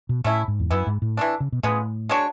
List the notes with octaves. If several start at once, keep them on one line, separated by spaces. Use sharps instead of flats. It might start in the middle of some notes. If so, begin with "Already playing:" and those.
B2
A2 A3 C#4 E4
G#2
E2
F#2 E3 B3 E4
G#2
A2
E3 A3 D4
C#3
B2
A2 C#3 G#3 B3
G#3 D4 F#4 C#5